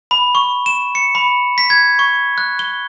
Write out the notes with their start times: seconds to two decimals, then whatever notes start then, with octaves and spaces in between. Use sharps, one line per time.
0.11 B5
0.35 C#6
0.66 E7
0.95 C#7
1.15 B5
1.58 B6
1.70 G#6
1.99 C#6
2.38 F#6
2.59 G7